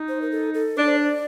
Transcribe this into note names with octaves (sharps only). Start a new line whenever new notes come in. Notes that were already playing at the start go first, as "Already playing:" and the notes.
Already playing: D#4
C5
A#4
A4
A4
D4 D5
C5
D5